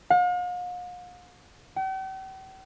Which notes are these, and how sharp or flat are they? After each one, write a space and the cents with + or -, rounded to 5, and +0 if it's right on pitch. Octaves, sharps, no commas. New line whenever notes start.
F5 +45
G5 -45